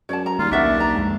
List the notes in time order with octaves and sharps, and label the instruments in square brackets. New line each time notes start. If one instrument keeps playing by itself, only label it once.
[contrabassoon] F#2 [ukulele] C#5 D5 A5
[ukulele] A#5
[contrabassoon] D#2 [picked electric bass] G3 [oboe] F4
[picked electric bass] B1 A#3 [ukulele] C#4 E5 F#5 [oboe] D4
[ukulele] A#5
[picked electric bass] F2 G#3